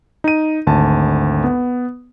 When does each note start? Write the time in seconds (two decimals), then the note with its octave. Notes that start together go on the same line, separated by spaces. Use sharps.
0.24 D#4 D#7
0.67 G#1 D2 A5
1.44 B3